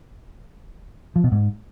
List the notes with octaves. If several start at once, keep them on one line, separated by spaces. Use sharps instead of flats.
F3
B2
G#2